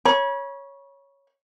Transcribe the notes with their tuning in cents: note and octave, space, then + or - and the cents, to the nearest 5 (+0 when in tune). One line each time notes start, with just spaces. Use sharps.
C#5 +0 B5 -40